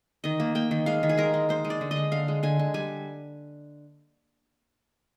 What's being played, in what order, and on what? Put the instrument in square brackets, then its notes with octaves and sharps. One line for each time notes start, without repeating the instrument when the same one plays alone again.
[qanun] D#3 D#5
A#3
A#3 G5
D#3
G#3 F5
D#3
G#4
G#3 A#4
G#3
G#3 C5
G#3
D5
D3
D#5
G#3
D3 F5
G#3
D3 G#5
D3
G3 G#5